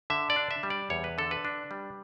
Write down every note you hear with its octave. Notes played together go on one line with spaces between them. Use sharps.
D3 E5
D5
D4
E5
G3
D5
E2 C#5
B4
D3 A4
B4
D4
G3